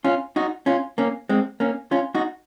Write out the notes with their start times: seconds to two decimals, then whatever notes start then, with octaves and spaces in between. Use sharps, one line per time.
0.04 C#4 F4
0.36 D#4 F#4
0.66 C#4 F4
0.98 A#3 C#4
1.29 G#3 C4
1.60 A#3 C#4
1.91 C#4 F4
2.15 D#4 F#4